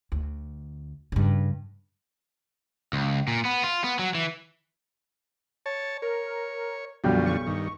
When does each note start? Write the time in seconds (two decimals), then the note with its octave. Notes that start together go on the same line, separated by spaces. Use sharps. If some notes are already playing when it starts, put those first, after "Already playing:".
0.12 D2
1.12 G2 C#3
2.93 C#2
3.28 A#2
3.45 B3
3.64 F4
3.84 B3
3.99 F#3
4.15 E3
5.66 C#5 A5
6.02 A#4 C#5
7.04 B1 F#2 D3 F3 G3 F#4
7.26 C#6
7.47 G2 D#3